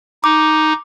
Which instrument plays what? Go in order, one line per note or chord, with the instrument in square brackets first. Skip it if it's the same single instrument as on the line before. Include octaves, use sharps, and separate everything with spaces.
[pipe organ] D#4 [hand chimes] D6